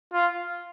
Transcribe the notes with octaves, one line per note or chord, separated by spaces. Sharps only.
F4